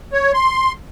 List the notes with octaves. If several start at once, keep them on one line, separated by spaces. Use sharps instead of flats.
C#5
C6